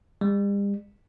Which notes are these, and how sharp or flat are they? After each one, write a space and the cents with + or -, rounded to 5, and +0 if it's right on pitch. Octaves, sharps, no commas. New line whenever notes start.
G3 +40